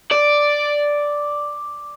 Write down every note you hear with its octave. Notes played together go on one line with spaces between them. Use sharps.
D5